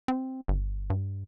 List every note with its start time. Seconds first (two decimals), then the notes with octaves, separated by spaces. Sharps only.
0.08 C4
0.48 G1
0.90 G2